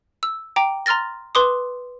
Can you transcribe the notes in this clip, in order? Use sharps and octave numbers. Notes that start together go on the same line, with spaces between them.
E6
G5 A#5 D6
A#5 C6 F6 A6 A#6
B4 C6 D6 D#6